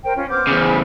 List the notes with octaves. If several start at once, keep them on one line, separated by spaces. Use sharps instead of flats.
A#4 C5 G5
C#4 F4
B3 C4 C5 D6 F6 G6
E2 C#3
B5